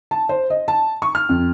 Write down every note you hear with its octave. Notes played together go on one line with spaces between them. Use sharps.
A5
C5
D#5
A5
C#6
F6
F2